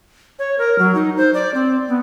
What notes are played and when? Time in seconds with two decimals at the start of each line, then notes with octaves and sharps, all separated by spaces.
0.39 C#5
0.58 A#4
0.79 F#3
0.95 D#4
1.17 C5
1.34 D5
1.54 C4
1.88 B3